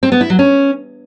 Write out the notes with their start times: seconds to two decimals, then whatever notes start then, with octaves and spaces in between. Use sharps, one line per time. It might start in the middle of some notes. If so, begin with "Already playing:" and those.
0.03 C4
0.12 B3
0.21 E4
0.30 F#3
0.39 C#4